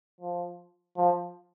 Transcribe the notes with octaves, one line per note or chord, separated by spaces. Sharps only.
F3
F3